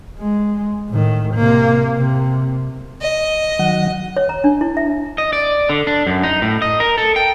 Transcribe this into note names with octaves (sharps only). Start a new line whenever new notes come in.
G#3
A2 D#3
C3 A#3
C3
D#5
D#3 F#3 F#5
C#5
A#5
D4
E4
E5
D#5
D5
D3
D4
F#2
D#4
A2
D#5
A#4
A4
G5